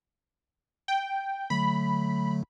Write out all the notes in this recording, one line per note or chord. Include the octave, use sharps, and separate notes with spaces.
G5
D3 F#3 A3 B5